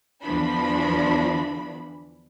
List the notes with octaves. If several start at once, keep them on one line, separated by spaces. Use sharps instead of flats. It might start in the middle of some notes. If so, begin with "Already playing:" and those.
E2 D3 E3 F3 D4 B5